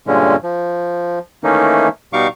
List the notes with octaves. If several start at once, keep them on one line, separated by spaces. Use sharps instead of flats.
G2 A#2 D3 G#3 C#4
F3
D#3 E3 A3 A#3 C#4 D#4
B2 G3 D#4 F5 C#6 D6